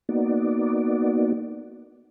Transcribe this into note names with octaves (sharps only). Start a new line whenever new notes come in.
A#3 B3 D#4 F#4 D5